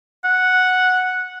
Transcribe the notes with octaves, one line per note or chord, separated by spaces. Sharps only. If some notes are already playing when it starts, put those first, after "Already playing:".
F#5